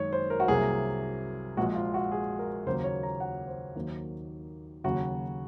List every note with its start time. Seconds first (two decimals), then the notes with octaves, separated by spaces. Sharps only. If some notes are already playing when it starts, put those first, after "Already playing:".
Already playing: F#1 F#2 D#3 G#3 C#5
0.13 C5
0.30 A#4
0.40 F#4
0.48 C2 C3 F#3 A#3 G#4
1.57 A#1 A#2 F3 G#3 F#4
1.75 F4
1.94 F#4
2.12 G#4
2.39 A#4
2.66 D#2 C#3 F#3 A#3 C5
2.84 C#5
3.03 A#5
3.20 F#5
3.48 C5
3.75 D#2 D#3 F#3 A#3
4.84 D#2 C#3 F#3 F#4